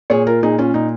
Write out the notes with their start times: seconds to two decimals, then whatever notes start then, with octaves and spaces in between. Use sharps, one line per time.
0.10 A#2 G#4 C#5
0.27 F4 A#4
0.43 A#2 D#4 G#4
0.58 C#4 F4
0.74 A#2 D#4